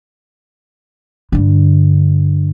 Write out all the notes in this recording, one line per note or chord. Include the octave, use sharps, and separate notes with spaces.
G2 D3